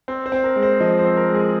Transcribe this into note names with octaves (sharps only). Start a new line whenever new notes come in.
C4
C5
C4
A#4
G#3
C5
F3 D#5
C5
C4
A#4
G#3
G#4